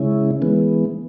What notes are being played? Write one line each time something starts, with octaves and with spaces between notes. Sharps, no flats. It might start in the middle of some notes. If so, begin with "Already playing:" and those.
Already playing: C#3 G#3 C#4 E4
E3 G#3 B3